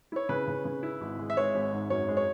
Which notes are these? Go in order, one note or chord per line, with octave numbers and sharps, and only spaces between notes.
E4 C#5
C#3 B4
C#3
C#3
E4
G#1
G#3
E5
G#3 C#5
G#1
G#2
F#2 C#5
G#3
C#5